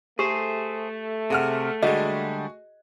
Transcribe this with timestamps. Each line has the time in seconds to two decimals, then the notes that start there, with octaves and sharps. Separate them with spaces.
0.19 A3 G4 G#4 C5
1.30 C3 G#4 F#5 F6
1.83 D3 G3 G#3 F#4 G#4 D#5